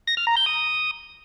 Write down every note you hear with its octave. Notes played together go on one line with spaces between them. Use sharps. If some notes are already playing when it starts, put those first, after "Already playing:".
A#6
F6
A#5
G6
D#6